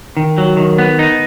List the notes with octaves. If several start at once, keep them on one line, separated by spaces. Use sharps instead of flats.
D#3
F#3
D#3
B3
D#4